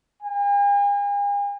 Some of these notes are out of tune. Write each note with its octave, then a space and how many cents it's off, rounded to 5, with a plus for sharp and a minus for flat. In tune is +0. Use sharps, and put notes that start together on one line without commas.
G#5 -45